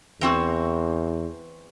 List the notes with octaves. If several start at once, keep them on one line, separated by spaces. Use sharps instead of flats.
E2 E3 C4 F#4